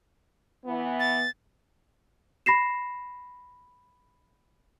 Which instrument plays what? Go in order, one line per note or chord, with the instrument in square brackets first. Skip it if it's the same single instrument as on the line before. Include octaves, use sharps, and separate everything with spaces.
[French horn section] E3 B3
[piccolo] A6
[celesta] B5 A#6 C7 E7